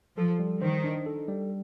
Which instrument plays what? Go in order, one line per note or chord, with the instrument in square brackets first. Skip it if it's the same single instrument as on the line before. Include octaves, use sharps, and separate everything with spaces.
[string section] F3 [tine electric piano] A4
[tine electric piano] G3
[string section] D#3 [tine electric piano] C5
[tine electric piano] D4
A4
G3